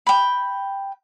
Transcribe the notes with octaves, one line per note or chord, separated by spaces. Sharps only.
G5 B5